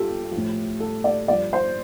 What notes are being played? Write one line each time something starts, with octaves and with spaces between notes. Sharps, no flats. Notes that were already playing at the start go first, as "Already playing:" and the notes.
Already playing: G2 F4 G4 A4
A2 F3
A4
D5
G2 F3 D5
C5